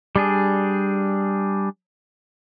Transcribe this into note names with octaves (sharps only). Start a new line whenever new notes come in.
G3 D4 G#4